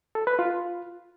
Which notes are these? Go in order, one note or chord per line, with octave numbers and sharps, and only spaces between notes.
A4
B4
F4